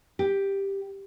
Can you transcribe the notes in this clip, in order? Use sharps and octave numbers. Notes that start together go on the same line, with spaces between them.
G4